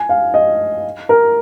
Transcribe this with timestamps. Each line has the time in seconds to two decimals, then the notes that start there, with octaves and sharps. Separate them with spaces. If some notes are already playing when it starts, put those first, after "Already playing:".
Already playing: G#5
0.09 F5
0.34 D#5
1.09 A#4